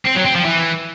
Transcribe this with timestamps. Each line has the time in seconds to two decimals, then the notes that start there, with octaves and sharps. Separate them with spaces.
0.05 C4
0.15 F#3
0.25 C4
0.35 F3
0.45 E3